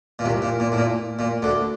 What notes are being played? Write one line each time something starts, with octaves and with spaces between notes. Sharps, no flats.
A#2
C2 C3
A#2
A#2
A2
A#2
A#2
D2 D3